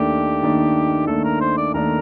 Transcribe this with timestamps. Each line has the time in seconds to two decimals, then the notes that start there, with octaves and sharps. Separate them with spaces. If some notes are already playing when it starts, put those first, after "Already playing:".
Already playing: D#2 D#3 A3 D4 G4
0.42 D#2 D#3 A3 D4
1.07 D#2 D#3 A3 D4 A4
1.24 A#4
1.40 C5
1.57 D5
1.74 D#2 D#3 A3 D4 A#4